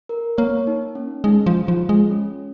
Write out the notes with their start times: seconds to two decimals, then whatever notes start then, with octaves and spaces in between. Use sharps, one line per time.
0.09 A#4
0.38 A#3 C#5
0.67 D#4
0.95 C#4
1.24 G#3 D#4
1.46 F3
1.67 F3 F4
1.89 G#3
2.10 C#4